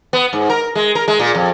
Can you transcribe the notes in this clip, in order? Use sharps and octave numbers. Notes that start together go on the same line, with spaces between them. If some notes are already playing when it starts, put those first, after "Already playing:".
B3
G#2
A#4
G#3
A#4
G#3
A#2
F2